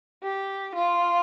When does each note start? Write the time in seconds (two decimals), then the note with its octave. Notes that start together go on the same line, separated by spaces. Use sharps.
0.24 G4
0.75 F4